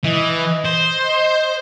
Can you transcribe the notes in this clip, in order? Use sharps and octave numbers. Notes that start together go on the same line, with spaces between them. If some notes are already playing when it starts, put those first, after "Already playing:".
E3 D#5
C5